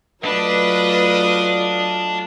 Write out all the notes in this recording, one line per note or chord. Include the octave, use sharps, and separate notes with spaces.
F#3 A3 D4 F4 B4 D#5